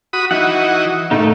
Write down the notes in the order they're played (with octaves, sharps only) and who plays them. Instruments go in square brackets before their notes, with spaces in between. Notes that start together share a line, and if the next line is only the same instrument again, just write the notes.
[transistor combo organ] F#4 B5 D#6
[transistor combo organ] E3 D#4 F#4 [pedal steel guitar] F#5
[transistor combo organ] A2 [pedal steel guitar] A3 A#3 D#4